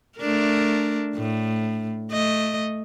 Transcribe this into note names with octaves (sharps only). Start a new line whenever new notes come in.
A3 D4 A#4
A2
A3 D#5